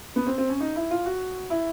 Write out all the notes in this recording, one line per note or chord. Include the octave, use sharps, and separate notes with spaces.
B3
C4
C4
C#4
D#4
E4
F4
F#4
E4